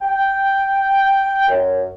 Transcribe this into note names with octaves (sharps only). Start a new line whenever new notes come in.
G5
F#2